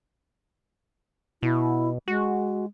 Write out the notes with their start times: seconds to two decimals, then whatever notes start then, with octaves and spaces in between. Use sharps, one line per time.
1.43 B2 E4
2.08 G#3 F#4